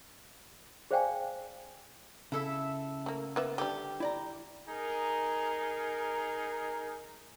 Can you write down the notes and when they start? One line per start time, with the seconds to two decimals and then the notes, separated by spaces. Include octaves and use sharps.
0.91 G#4 C5 D5 F5 G5 G#5
2.32 C#3 E4 A4 E5
3.06 A3 A#3
3.36 A#3 B3 E5
3.58 D3 G3 G4
4.00 E4 D5 A#5
4.69 D#4 G#4 A#4